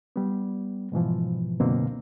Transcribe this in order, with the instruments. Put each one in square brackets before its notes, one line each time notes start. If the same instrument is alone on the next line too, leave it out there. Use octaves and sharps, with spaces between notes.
[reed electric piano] G3 B3
G#2 B2 E3 F3
C#2 F#2 B2 D3 A#3 C4